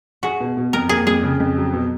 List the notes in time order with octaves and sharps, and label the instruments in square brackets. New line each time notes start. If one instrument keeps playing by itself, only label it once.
[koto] F#4 [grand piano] G#4
[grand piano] B2
B2
[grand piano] F2 [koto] A#4
[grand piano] A#3 [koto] G#4
[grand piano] F2 [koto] G#4
[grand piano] C#3
F2
F#3
B2